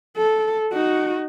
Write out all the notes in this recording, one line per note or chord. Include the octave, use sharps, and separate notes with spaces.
A4
D#4 F#4